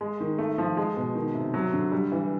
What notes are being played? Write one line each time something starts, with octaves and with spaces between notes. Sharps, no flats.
G#3
D#3
A3
F3
G#3
B2
D#3
C3
F#3
D3
G3
E3